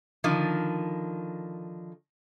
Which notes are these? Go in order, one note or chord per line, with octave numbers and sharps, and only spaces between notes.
D3 D#3 F3